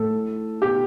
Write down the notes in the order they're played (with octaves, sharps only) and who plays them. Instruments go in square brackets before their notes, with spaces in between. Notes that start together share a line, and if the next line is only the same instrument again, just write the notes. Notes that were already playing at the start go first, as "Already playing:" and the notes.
Already playing: [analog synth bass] A2 [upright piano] A4
[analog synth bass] B2 [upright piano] G4